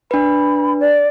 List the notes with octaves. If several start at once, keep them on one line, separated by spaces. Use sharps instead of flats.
D4 B4 B5
D5